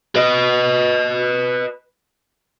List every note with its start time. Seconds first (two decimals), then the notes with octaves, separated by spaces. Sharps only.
0.16 B4 D#5